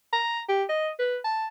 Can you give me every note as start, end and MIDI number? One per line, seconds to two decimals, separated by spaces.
0.13 0.40 82
0.49 0.64 67
0.69 0.90 75
0.99 1.18 71
1.24 1.47 81